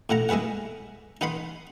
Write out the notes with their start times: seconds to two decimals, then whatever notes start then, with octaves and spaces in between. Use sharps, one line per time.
0.09 A2 E4 F#5 A#5
0.29 G#3 E4 G#4 B4 F#5
1.21 D#4 B4 F#5 B5 C6